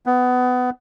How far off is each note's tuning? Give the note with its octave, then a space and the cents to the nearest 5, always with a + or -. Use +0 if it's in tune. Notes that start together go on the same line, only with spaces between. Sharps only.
B3 +20